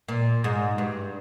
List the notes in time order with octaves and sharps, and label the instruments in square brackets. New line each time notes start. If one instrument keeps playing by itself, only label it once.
[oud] A#2
G#2
G2